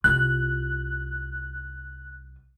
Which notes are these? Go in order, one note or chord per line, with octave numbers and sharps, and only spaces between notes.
C2 F4 F#6